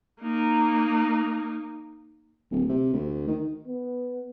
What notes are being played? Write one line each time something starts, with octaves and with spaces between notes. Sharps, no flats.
A#3 D#4
D1
C3
D2
D#3
B3